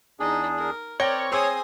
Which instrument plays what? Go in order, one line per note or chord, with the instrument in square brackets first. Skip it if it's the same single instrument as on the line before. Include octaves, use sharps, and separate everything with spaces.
[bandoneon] E2 D4 G#4 [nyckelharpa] D#4
[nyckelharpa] A#4
[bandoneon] C4 [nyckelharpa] A#4 D5 [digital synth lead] C#5 [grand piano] G5 A#6 G7
[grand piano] G#4 C5 E6 [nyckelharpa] G#5 D#6